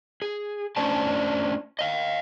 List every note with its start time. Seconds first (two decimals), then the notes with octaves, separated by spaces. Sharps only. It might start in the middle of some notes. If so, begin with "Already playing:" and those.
0.22 G#4
0.76 A3 C#4 D4 C5 D5 A5
1.79 D#5 F5